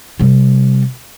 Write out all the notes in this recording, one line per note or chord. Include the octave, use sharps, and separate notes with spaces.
C3 G3